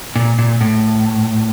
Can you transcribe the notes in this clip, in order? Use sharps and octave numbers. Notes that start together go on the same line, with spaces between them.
A#2
A#2
A2